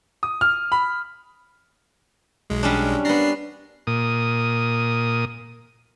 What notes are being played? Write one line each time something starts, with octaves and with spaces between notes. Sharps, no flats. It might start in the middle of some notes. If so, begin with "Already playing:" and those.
D#6
F6
B5
B1 G#3
G3 C#4 D4
B3 D4 A#5 C7
A#2 D#6